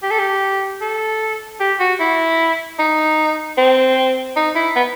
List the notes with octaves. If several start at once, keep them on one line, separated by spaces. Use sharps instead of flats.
G4
A4
G4
A4
G4
F#4
E4
D#4
C4
D#4
E4
B3